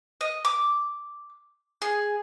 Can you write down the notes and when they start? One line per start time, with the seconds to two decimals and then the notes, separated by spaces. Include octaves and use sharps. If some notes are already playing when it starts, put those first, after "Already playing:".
0.21 D#5
0.45 D6
1.82 G#4